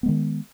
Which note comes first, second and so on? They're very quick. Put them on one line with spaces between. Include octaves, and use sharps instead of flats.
B3 G#3 D#3